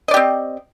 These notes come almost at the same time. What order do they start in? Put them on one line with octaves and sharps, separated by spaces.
D#5 D5 G4 C4